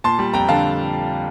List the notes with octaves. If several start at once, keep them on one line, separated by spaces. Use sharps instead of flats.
A#2 A5 C6
G3
F2 G5 A#5
D3 F5 A5